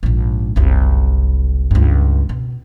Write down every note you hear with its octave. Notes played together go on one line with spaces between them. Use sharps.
A#1 G#2
F#1 C2
C#2 G2
B2